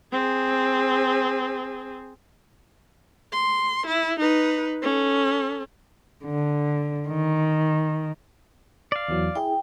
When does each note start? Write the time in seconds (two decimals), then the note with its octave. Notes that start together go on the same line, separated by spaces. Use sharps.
0.13 C4 G#4
3.33 C6
3.87 E4
4.20 D#4 B4
4.82 C#4 A4
6.25 D3
7.09 D#3
8.92 D5 F5
9.08 E2 E3 F#3
9.35 E4 G#4 G5